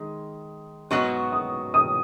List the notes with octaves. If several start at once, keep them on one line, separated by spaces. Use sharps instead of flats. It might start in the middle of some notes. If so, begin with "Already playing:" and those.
Already playing: D#3 G#3
G#2 F#3 B3 F#4 C#6
D#6
D#6